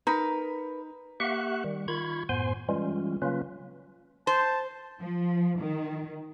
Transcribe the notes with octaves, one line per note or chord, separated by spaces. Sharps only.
D#4 A#4 B4
A#3 G4 E5 F#5 C#6 F#6
D#3 G3
D#3 F4 B5 C#6 G#6
F#2 A2 B3 C5 G#5 C6
E3 G3 G#3 C#4 F4
C#3 F#3 A#3 C#4 F4 B4
C5 A5
F3
D#3